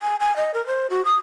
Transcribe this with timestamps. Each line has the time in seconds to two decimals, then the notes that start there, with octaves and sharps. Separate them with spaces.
0.02 G#5
0.20 G#5
0.36 D#5
0.54 A#4
0.67 C5
0.90 F#4
1.05 D#6